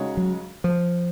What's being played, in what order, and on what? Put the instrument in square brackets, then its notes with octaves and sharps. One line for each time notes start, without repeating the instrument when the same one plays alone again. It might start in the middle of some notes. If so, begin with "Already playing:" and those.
Already playing: [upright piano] C#3 G#3 D#4 F#4 C#5
[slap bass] F#3
F3